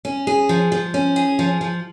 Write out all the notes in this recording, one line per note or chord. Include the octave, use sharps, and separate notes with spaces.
C#4
G#4
F3
F3
C#4
G#4
F3
F3